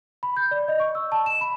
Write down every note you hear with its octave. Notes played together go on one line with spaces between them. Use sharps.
B5
G6
D5
D#5
C#6
E6
A5
E7
B5